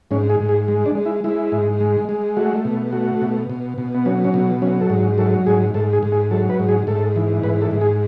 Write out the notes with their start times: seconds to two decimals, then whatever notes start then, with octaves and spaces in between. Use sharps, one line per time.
0.11 G#2 C#4
0.30 G#4
0.40 G#2
0.49 G#4
0.68 G#3
0.86 D4
0.95 G#3
1.05 E4
1.24 G#3 E4
1.52 G#2
1.80 G#3
2.09 G#3
2.37 A3 F#4
2.65 B2
2.92 A3 F#4
3.21 B2
3.50 B2
3.78 B2
3.95 B3
4.05 F#3 C#4
4.24 C#4
4.34 B2
4.62 F#3 C#4
4.81 A4
4.90 G#2
5.18 F#3 A4
5.46 G#2 G#4
5.74 G#2 A4
5.93 G#4
6.03 G#2
6.12 G#4
6.31 F#3 A4
6.49 B4
6.60 G#2
6.69 G#4
6.87 G#2 A4
7.16 E3
7.43 G#2 B4
7.62 A4
7.71 G#2
7.81 G#4